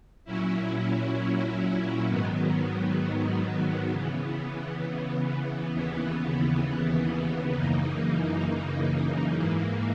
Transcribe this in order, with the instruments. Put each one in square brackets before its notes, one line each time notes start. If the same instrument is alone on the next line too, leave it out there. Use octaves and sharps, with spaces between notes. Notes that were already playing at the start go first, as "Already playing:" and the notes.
[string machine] A#2 F#3 C#4 E4
G#2 D#3 F#3 B3
C#3 E3 B3
D#2 C#3 E3 B3
F#2 C#3 E3 A#3 D#4
G#2 E3 A#3